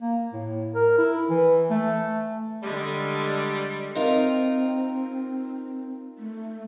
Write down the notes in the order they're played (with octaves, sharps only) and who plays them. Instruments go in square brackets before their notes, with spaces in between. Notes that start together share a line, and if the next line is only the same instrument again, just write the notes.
[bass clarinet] A#3
A2
A#4
E4
E3
A3
[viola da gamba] D3 G#3 [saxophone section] G3
[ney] C4 [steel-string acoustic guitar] D#4 F4 A#4
[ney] A3